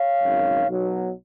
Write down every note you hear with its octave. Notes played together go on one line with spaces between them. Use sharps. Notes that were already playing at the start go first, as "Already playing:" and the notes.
Already playing: C#5 F5
G#1 F#2 D#3 G#3
B1 B2 F#3